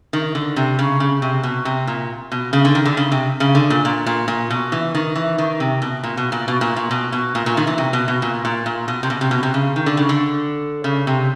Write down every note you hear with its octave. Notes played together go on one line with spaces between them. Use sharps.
D#3
D3
C3
C#3
C#3
C3
B2
C3
A#2
B2
C#3
D3
D#3
D3
C#3
C3
C#3
D3
A#2
A#2
A#2
A#2
B2
E3
D#3
E3
D#3
C3
B2
A#2
B2
A#2
B2
A#2
A#2
B2
B2
A#2
A#2
D#3
E3
C3
B2
B2
A#2
A#2
A#2
B2
C3
B2
C3
B2
C3
C#3
D#3
D3
C#3
D3
C#3
C3